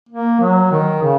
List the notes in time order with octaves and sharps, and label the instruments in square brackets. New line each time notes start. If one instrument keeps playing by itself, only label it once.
[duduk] A#3
F#3
D#3
C#3